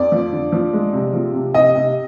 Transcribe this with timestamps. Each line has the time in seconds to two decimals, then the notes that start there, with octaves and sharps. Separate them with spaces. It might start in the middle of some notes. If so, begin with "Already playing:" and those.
Already playing: F2 D5
0.12 F3
0.32 D3
0.52 F3
0.73 G#3
0.93 C3
1.13 F3
1.34 C3
1.54 C3 D#5
1.75 C3